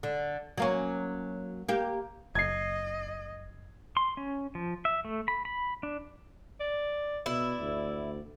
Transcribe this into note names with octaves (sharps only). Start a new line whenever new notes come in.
D3
F#3 A#3 C#4
A#3 G4
F#1 D#5 G#6 C7
C6
C#4
F3
E5
A3
B5
B5
D4
D5
B2 E4 D5
D2